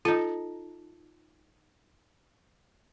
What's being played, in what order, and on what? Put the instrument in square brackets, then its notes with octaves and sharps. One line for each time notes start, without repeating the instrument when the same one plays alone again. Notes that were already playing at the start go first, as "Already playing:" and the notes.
[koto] D#4 A4 [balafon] F4